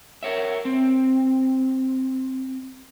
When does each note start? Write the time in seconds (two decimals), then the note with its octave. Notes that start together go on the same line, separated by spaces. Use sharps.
0.23 A#4 C#5 E5
0.65 C4